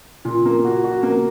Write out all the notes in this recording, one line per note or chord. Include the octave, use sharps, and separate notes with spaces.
A#2
A#3
F#4
F#4
A#3